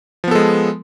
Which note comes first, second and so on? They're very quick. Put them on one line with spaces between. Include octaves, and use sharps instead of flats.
F3 B3 A4 G#3